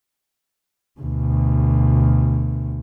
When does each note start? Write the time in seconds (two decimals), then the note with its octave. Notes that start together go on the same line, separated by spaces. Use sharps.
1.00 D2 B2